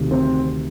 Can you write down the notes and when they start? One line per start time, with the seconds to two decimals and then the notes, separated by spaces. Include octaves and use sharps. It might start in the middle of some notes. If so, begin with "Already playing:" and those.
Already playing: D2 C3 D#3
0.11 C4